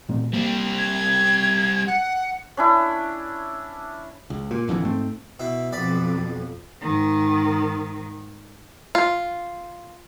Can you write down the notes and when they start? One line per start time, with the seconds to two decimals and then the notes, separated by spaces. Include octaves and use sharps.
0.09 A#2 A3 C4
0.34 G3 A#3 C4
0.78 G#6
1.87 F#5
2.57 C#4 D4 E4
4.30 C#2
4.51 A#2
4.68 A1 F2 D3 E3
4.84 G#2 A3 C4
5.39 B2 E4
5.72 B1 F2 D5 B5
6.81 G#2 D#3
8.95 F4